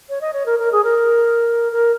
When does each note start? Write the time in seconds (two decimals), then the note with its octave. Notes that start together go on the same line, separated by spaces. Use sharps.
0.09 C#5
0.21 D#5
0.33 C#5
0.46 A#4
0.59 A#4
0.72 G#4
0.84 A#4
1.72 A#4